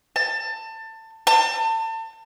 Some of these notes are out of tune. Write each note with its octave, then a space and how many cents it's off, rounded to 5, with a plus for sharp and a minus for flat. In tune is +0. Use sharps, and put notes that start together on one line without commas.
A5 +20
A5 +35